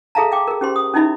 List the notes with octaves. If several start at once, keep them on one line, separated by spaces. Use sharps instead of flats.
G#4 A4 E5 F5 A5 A#5
F5 G5 D6
G#4 A#4
C#4 G4 C5 C6
D#6
C#4 D#4 E4 D#5 E5 B5